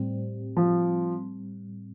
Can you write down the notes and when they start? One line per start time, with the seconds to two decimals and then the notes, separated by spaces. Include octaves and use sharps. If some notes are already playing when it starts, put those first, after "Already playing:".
Already playing: A2 G3 C4
0.57 F3